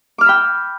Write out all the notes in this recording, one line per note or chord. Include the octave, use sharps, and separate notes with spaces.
G5 B5 D6 E6 F6